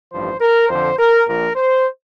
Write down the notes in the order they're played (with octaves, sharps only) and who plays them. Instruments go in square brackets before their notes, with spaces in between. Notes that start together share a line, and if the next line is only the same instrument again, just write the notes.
[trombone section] A1 G2 F3 C5
A#4
F2 D3 F3 C5
A#4
A#1 A#2 F3 A#4
C5